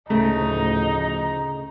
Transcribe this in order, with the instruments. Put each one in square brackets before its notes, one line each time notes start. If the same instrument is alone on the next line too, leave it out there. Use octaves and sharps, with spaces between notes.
[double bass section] D2 A2 F3 [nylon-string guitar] C#3 A3 [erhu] D#4 [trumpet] A#5